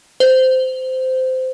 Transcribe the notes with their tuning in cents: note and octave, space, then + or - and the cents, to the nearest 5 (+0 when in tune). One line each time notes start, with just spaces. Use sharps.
C5 -15